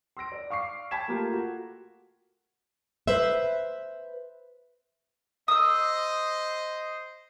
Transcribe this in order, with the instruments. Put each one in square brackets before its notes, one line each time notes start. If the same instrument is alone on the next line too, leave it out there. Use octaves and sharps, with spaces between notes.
[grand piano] C6 E6 A#6 D7
D5
F5 C#6 D6 C7
G5 A5 B5 G#6 B6 E7
A3 A#3 F4 G4 A#4
F#4
[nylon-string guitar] B4 C5 E5
[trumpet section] C5 D#5 [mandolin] D#6 E6